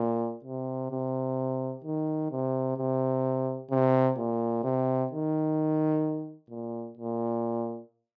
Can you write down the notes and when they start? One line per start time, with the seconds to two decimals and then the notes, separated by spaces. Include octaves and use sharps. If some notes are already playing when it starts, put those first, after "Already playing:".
Already playing: A#2
0.44 C3
0.91 C3
1.84 D#3
2.31 C3
2.77 C3
3.70 C3
4.17 A#2
4.64 C3
5.11 D#3
6.50 A#2
6.97 A#2